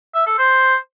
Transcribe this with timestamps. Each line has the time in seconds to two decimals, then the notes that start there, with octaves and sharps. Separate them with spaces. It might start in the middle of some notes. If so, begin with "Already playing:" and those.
0.14 E5
0.26 A4
0.38 C5